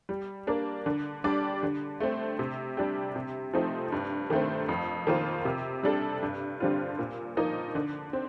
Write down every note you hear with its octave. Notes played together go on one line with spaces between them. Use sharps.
G3
A#3 D4
D3
G3 D4 G4 D5
D3
A3 C4
C3
G3 D4 G4
C3
F3 A3 C4 D#4
G2
D#3 A3 C4
F2
D#3 A#3 F4 C5
C3
G3 D4 A4
G2
D3 G3 C4 F4
A#2
F3 A#3 D#4
D3
C4